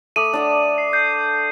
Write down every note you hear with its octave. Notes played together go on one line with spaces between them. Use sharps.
A3 D6 D#6 D#7
D4 D5 F#5
C7
G6 C7